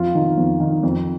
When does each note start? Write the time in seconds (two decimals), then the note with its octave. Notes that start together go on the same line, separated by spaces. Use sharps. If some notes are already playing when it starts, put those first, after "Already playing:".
Already playing: F2 F4
0.15 D#3
0.38 F2
0.60 D#3
0.83 F2